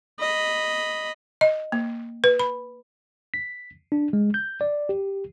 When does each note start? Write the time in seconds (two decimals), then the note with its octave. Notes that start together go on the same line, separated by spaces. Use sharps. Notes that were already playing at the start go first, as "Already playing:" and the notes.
0.20 D#5 B5
1.41 D#5
1.72 A#3
2.24 B4
2.40 B5
3.34 B6
3.92 D4
4.13 G#3
4.34 G6
4.61 D5
4.89 G4